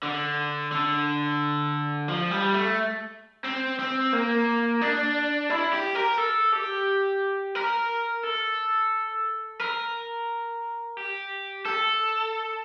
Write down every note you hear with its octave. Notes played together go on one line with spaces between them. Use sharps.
D3
D3
F3
G3
A3
C4
C4
A#3
D4
E4
G4
A#4
A4
G4
A#4
A4
A#4
G4
A4